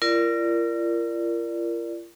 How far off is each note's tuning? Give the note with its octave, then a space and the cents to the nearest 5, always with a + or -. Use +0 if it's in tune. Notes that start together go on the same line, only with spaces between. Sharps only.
F4 -40 A#4 +0 D5 +0